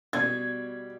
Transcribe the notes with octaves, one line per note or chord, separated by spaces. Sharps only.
B2 G3 G#6